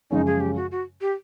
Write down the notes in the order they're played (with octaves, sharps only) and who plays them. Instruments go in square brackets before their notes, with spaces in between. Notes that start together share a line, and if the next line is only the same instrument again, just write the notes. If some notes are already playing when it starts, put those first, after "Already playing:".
[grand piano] F#2 C#3 F3 G#3 C#4 [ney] D#4
[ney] G#4
G4
F#4
F#4
G4